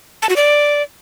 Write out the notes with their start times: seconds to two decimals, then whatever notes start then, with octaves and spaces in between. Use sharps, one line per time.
0.22 A5
0.29 F#4
0.36 D5